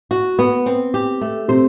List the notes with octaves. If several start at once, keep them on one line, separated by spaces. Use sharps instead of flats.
F#4
B3
C4
G4
A3
C3 C5